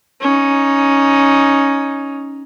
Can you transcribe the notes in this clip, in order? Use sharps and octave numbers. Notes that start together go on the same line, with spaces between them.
C#4 D#4